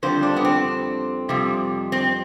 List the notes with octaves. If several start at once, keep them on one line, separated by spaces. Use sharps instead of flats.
F2 D3 G3 C5
D4
B3
C4
F2 C3 G3
C4